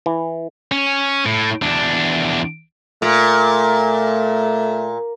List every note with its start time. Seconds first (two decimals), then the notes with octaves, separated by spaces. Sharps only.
0.06 E3
0.72 C#4
1.26 A2
1.62 E2 D4
3.02 A#2 A3